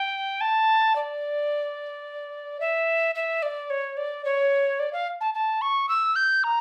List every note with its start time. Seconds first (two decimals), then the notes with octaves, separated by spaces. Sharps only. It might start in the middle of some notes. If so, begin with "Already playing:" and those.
Already playing: G5
0.41 A5
0.96 D5
2.60 E5
3.15 E5
3.42 D5
3.70 C#5
3.97 D5
4.25 C#5
4.80 D5
4.93 F5
5.21 A5
5.34 A5
5.62 C#6
5.89 E6
6.16 G6
6.44 A#5